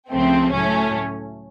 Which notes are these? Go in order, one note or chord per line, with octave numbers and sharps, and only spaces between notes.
C#2 C#3 F3 A3 C4
A2 F#3 A3 C#4